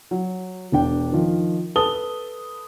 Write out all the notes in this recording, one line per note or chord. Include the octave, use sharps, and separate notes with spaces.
F#3
E1 D4 G5
D#3 F3
A4 B4 A5 D#6 G7